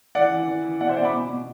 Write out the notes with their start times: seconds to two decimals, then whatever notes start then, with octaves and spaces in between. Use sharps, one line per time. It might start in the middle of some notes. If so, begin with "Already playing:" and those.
0.15 E3 D5 F#5
0.32 E3
0.48 E3
0.64 E3
0.80 B2 D5 F#5
0.89 C5 E5
0.96 B2 D5 F#5
1.05 B5 D6
1.13 B2
1.29 B2